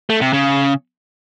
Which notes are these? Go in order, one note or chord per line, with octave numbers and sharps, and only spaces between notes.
A3
C3
C#3